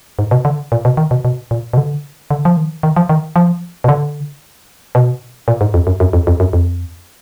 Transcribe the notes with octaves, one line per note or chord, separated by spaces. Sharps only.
G#2
B2
D3
A#2
B2
D#3
B2
B2
A#2
B2
D3
D3
F3
D#3
D#3
F3
D#3
F3
B2
D3
B2
A#2
G#2
F2
F#2
F#2
F2
F2
F#2
F2